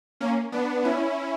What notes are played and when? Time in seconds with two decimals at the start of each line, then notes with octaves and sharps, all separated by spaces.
0.21 A#3 C#4
0.52 B3 D4
0.84 C#4 E4